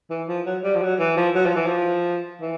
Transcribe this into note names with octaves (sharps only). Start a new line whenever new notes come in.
E3
F3
F#3
G3
F3
F#3
E3
F3
F#3
F3
E3
F3
E3